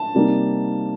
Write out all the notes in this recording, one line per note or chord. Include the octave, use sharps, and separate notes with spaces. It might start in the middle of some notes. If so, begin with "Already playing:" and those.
Already playing: A5
C3 G3 A#3 D#4